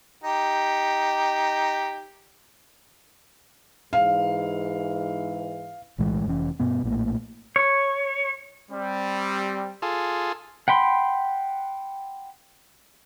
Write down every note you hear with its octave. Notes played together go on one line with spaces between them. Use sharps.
D#4 G4
G#2 E3 F5
B1 A2 E3 G#3
F1 E3 C#4
G2 B2 B3
A#1 A2 A#3
C#5
G3 C4
F4 G#4 A4
F#5 G5 B5 C6